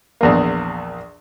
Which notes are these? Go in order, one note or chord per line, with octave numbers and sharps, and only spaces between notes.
A#1 E2 A#3